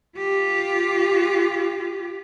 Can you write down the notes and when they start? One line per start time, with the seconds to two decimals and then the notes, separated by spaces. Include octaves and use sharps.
0.17 F4 G4